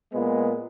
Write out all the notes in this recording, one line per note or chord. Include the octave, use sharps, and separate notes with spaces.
A#2 G#3 B3